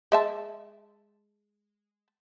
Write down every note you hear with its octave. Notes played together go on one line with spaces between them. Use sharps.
G#3 E5 A5